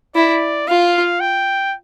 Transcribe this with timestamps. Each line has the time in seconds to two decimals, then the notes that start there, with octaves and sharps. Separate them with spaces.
0.15 E4 D5
0.68 F4 F5
1.20 G5